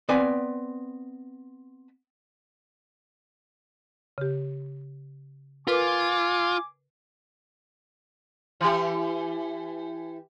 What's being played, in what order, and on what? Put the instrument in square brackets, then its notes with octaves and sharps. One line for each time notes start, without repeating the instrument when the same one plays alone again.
[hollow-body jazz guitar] B3 C4 B4 D5 G#5
[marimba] C#3 G4
[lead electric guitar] F4 [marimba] A#4 B4 [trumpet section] G#5 D6
[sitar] E3 G4